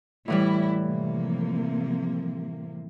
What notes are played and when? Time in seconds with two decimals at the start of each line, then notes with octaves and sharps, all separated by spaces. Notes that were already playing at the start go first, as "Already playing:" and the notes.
0.28 A2 E3 G3 E4
0.85 C3 F3 A#3